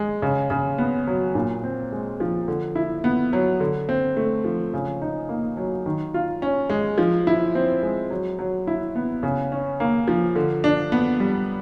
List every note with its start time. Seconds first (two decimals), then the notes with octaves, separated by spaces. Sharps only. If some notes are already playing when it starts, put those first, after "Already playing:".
Already playing: G#3
0.22 C#3
0.50 C#3
0.78 B3
1.07 F#3
1.35 A#2
1.64 C4
1.92 G#3
2.20 F3
2.48 D3
2.75 E4
3.04 B3
3.33 F#3
3.60 D3
3.89 C4
4.17 A3
4.44 F3
4.74 C#3
5.02 D#4
5.29 A#3
5.57 F#3
5.86 D#3
6.14 F4
6.42 C#4
6.70 G#3
6.98 F3
7.27 E4
7.55 C4
7.83 G#3
8.10 F#3
8.39 F#3
8.67 E4
8.96 B3
9.23 C#3
9.52 C#4
9.80 A#3
10.08 F3
10.36 D3
10.64 D4
10.92 B3
11.20 G3